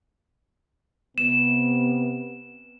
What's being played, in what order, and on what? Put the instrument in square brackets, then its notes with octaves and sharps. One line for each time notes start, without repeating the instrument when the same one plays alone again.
[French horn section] C3 B3 [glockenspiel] E7